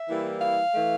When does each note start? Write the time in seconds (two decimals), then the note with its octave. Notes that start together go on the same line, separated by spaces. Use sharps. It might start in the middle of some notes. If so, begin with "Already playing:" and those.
Already playing: E5
0.08 E3 G3 A#3 E4
0.42 F5
0.74 E3 A3